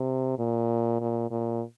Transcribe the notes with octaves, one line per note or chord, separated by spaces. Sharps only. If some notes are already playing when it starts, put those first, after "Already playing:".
Already playing: C3
A#2
A#2
A#2